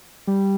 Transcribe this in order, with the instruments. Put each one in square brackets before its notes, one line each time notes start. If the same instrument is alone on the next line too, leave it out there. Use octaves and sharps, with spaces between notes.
[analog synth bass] G3